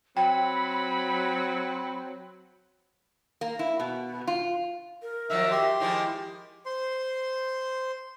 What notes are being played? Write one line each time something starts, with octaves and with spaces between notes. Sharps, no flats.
F#3 C4 G5 B5
A#3
E4
B2
F4
A#4
D#3 F3 F#3 E5
G4 E5 C6
D#3 F3 G#3 E4
C5 C6